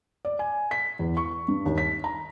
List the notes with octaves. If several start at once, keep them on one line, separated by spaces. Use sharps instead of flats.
D5
G#5
B6
E2
C#6
G2
D#2
B6
A#5